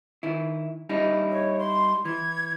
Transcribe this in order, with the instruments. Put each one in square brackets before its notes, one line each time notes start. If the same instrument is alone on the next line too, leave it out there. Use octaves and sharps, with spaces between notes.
[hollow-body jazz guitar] D#3 E4
G3 D#4 E4
[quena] C#5
C6
[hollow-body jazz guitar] E3 [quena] G#6